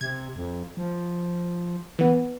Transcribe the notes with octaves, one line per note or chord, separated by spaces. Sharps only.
C3 G#6
F2
F3
E3 B3